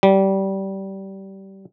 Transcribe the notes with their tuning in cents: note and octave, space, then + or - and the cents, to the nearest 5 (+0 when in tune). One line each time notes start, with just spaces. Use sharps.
G3 -20